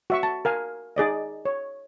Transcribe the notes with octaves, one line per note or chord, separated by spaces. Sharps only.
F#4 E5 C#6
A5
A#4 F5 G#5
D#4 G#4 D5 D#5
C#5